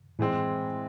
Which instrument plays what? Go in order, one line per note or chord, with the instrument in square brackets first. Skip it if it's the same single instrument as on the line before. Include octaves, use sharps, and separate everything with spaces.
[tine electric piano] A2 [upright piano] E3 G#3 C4